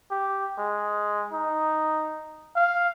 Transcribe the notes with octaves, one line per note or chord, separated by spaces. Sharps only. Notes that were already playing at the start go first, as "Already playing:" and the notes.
G4
G#3
D#4
F5